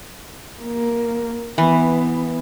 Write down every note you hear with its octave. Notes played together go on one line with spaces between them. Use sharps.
A#3
E3 B3